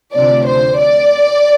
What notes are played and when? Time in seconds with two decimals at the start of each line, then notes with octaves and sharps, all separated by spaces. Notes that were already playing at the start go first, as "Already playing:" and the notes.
0.14 D2 C3 F3 D4 D5
0.47 C5
0.80 D5